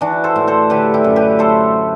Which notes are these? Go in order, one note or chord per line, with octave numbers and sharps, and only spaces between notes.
E3 D4 F#4
A4 C5
A2
A4 C5
D3 G4 B4
E4 G4
F#2
G4 B4
A3 A4 C5